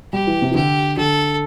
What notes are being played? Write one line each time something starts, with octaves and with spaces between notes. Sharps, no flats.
G3 G4
E3
C3
E3
D3 G4
D3 A4